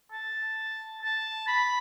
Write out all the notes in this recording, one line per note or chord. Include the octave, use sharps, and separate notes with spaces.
A5
A5
B5